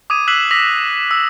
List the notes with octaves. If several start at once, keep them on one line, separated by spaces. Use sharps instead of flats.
D6 D#6 G#6 D#7
E6 F#6 B6 C7 E7 F#7
D6 E6 A#6 B6 F7 F#7
E6